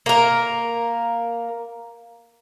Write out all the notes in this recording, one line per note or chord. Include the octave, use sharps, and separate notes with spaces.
A#3 A#4